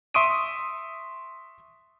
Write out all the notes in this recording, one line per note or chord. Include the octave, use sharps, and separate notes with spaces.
E5 C6 C#6 D#6 D7 D#7